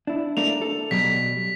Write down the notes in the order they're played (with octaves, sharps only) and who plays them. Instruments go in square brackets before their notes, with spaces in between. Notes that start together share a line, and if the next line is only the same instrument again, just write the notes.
[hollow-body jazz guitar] D4 E4
[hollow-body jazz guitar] A3 A#3 D4 [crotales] F7
[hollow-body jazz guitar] A4
[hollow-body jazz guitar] B2 F#3 G3 [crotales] B6